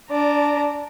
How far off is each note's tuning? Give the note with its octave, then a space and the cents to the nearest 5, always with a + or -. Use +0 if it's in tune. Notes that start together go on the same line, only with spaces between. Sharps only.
D4 -20 D5 +0 A#5 -20